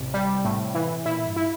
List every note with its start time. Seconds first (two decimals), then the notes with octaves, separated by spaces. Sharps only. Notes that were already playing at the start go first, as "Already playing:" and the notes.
Already playing: A1 C3
0.14 G3
0.45 A2
0.75 E3
1.06 A#2 E4
1.26 G2
1.36 E4